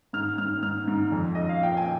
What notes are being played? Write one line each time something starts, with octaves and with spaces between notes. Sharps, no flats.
G#2 F6
G#2 F6
G#2 F6
G#2
F2
F2 D#5
F5
A#2 G5
G#5